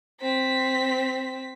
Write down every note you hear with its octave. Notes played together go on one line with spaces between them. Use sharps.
C4 B6